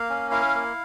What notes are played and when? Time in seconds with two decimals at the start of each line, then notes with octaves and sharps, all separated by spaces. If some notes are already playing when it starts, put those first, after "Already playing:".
Already playing: A#3 F5
0.10 C#4
0.31 E4 F5
0.55 A#3